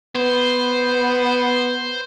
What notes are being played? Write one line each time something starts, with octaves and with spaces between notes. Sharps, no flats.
B3 C5